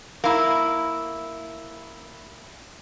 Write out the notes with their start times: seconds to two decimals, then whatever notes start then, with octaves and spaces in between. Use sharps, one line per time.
0.24 A#3 E4